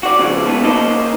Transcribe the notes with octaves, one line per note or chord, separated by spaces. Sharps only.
F#4 D5
A2 C#3 E3 F3
G#2 B2 A3 B3
A#3 C#4 D#4 C5 D#5